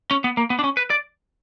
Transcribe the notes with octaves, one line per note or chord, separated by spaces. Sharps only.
C#4
B3
A#3
B3
D4
C#4
B4
D5